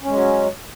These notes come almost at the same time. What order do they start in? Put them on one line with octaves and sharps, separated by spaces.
C#4 G#3 F#3